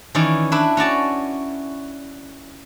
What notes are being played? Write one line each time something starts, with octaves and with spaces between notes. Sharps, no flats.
D#3 E3 C#4 E4 D5
D4 E4 B4
C#4 F#4 D5 A5